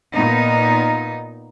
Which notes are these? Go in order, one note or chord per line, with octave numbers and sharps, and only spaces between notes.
A#2 B3 D#4